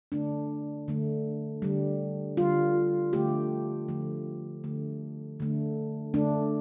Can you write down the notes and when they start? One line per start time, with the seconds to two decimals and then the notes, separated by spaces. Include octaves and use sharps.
0.12 D3 A3 D4
0.88 D3 A3
1.62 D3 G3
2.37 D3 G3 F4
3.13 D3 F3 A3 G4
3.88 D3 F3 A3
4.64 D3 A3
5.40 D3 A3
6.14 D3 A3 D4